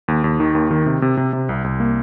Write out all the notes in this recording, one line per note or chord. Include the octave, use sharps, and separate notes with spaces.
D#2
D#2
D#3
D#2
D#3
C3
C3
C3
C3
C2
C2
A#3